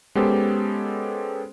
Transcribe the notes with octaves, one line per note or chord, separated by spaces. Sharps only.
G#3 B3 C#4 G4 A4 C5